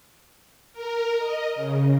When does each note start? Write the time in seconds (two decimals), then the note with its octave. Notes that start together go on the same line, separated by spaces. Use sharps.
0.73 A#4
1.19 D#5
1.56 C#3